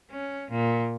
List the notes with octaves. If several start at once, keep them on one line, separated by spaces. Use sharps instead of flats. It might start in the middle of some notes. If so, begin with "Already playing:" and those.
C#4
A#2